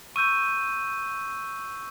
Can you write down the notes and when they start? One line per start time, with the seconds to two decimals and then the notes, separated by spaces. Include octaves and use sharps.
0.16 C#6 E6 G6 D#7